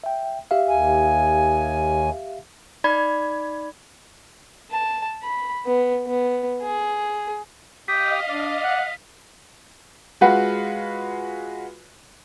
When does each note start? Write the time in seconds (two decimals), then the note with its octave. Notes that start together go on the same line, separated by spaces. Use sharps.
0.04 E5 G5
0.51 G4 E5 F5
0.69 D#2 G#5
2.84 D#4 D5 B5 G#6
4.71 A5
5.23 B5
5.66 B3
6.06 B3
6.62 G#4
7.88 G4 D#5 F5 G5 D#6 B6
8.29 D4 D5
8.64 F#5
10.21 G#3 F4 F#4 B4 F#5